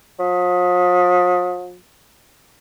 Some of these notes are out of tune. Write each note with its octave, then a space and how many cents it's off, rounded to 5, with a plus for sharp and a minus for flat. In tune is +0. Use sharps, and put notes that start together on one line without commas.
F3 +40